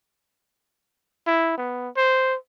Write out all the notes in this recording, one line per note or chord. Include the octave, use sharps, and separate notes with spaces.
E4
B3
C5